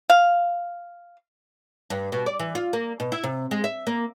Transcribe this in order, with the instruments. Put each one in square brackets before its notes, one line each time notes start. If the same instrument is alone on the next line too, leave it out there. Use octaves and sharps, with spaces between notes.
[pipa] F5
[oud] G2
B2
D5
E3
F4
A#3
B2
E4
C3
G#3
E5
A#3